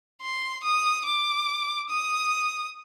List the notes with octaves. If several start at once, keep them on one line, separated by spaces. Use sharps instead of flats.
C6
D#6
D6
D#6